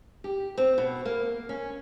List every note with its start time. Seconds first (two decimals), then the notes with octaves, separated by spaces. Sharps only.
0.24 G4
0.58 C4
0.78 B2
1.05 A#3
1.49 C#4